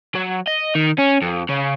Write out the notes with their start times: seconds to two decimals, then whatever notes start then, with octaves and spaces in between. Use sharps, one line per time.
0.15 F#3
0.47 D#5
0.75 D#3
0.98 C#4
1.22 F2
1.49 C#3